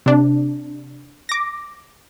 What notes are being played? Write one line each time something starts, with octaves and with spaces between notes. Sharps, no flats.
C3 D4
D6 A#6